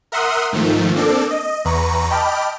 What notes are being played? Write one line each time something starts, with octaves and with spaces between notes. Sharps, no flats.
A#4 E5 F#5 C6 D#6
G#2 D#3 F3 A3
A#3 C4 D4 A4 D6
D#5
E2 B4 A#5 C#6
D#5 G5 A5 B5 D6 F6